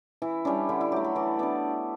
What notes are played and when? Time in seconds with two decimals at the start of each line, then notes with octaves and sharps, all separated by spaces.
0.22 E3 E4
0.45 G3 C#4 D4
0.69 D3 E4
0.81 E4
0.92 F#3 A3 G4
1.04 A4
1.15 E3 D5
1.39 B3 D4 D5